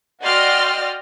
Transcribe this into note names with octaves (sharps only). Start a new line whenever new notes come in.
F#4 D5 D#5 G5 C6 F6